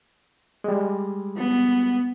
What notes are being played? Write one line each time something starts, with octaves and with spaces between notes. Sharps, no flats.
G3 G#3
B3